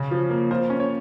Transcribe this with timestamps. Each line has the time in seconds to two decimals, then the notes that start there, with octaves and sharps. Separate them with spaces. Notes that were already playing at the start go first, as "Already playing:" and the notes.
Already playing: C#3 C#4
0.11 F3
0.30 A#3
0.51 F4 C5
0.70 C#4
0.80 C#5